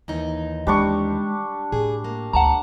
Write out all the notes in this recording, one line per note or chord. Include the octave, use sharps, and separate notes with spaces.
D#2 E3 D#4
G3 G#3 D4 C#6
A2 G#4
A#3
D2 F#5 A5 A#5